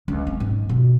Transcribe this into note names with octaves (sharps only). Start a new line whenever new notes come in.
C#2
C4
G#2
B2